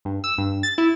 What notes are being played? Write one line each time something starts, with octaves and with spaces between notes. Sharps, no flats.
G2
E6
G2
A6
E4